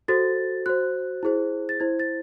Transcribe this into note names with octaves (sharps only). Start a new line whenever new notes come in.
F#4 A4 C5 A6
F#4 C5 F#6
E4 G#4 C5
A6
E4 C5 G#6
A6